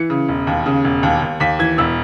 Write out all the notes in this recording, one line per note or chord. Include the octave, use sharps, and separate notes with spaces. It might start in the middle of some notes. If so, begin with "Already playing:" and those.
Already playing: E3 C#7
C#3
E1
D#2
C#3
E1
D#2
D#2
D#2 B6
E3 G#6
E1 E6